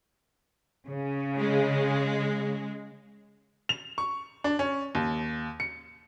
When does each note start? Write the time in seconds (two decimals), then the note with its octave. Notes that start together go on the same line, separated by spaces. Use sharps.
0.87 C#3
1.37 G#3
3.69 F7
3.98 C#6
4.44 D4
4.59 C#4
4.95 D#2
5.60 C#7